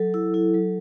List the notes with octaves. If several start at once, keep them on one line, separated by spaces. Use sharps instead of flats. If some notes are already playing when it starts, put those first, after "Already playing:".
Already playing: F#3 A4
E4
E4
F#3